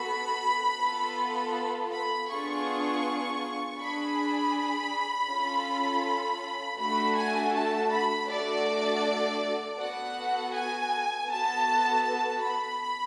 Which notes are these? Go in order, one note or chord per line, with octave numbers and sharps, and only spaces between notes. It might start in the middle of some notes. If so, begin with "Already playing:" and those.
Already playing: B3 F#4 A4 B5
B3 F4 A4
B5
B3 D4 F4 G#4 C#6
D4 G#4 B5
C#4 F4 A4
A3 D4 F#4 A4 B5
G#5
A5
B5
A3 D4 F#4 A4 D5
B3 F#4 A4 F#5
G#5
B3 F#4 A4 A5
A5
B5